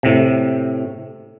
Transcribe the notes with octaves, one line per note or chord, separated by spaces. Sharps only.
A2 C3